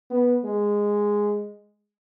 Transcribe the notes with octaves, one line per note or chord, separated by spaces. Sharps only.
B3
G#3